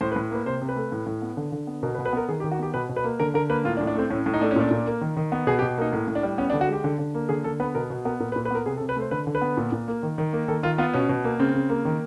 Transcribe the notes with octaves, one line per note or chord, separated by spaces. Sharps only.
A2 C5
B4
A2
A#3 B4
C3 C5
C3
B4
A3
A2
A2
B3
D3
D3
B3
B2 A#4
B4
B2
B4
B3 A#4
D#3 G#4
G4
D#3
F#4
B3 G4
B2 B4
B2
B4
A#3
D3 A#4
D3 A#4
A#3 B4
A2 F4
D4
A2
D4
A3 C4
A2 C#4
A2
D#4
A3 D4
C#4
A#2 D4
A#2
A#3
D#3
D#3
B3
B2 G#4
G4
B2
A#3 D#4
A2
A2
D4
G3
B3 C#4
D4
D3
F#4
G#3 G4
D3
D3
A#3
D3 G#4
D3 A4
B3 B4
B2 A#4
B2
B3 A#4
A#2 A#4
B4
A#2
B4
B3 A#4
C3 G#4
A4
C3
B4
A3 C5
D3 B4
D3
B4
B3
A#2
A#2
A#3
D#3
D#3
A#3
D#3 A4
D#3 F4
B3 F4
B2 C#4
B2
A#3
C#3 C4
C#3
A#3
D#3